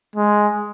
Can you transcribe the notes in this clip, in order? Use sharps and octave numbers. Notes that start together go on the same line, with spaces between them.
G#3